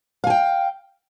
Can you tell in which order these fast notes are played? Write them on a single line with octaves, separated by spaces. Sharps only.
F5 G#5 G5